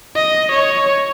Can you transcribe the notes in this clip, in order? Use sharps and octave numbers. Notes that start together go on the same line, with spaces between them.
D#5
C#5